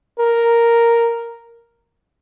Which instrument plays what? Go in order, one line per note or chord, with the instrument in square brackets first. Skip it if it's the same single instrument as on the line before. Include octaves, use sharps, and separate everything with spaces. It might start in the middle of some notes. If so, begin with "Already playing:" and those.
[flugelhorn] A#4